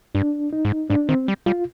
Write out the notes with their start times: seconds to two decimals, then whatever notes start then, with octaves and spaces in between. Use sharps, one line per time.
0.15 G2 D4
0.53 D#4
0.65 G#2
0.90 G#2 D4
1.09 D#3 C4
1.28 G3
1.46 G3 F4